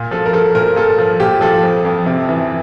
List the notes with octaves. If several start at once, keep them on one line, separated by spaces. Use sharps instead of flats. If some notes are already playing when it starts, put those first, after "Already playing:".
Already playing: A#2
F3 A4
A#4
F3 A4
A#2 A#4
A#2 A4
F3
A#2 G4
F3 A4
F2
F2
C3
E3